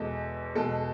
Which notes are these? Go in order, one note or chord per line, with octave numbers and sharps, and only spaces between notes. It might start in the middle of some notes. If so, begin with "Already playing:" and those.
Already playing: E2 B2 G#3 A4
E2 B2 G#3 A4